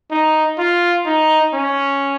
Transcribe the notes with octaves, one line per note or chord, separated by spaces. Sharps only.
D#4
F4
D#4
C#4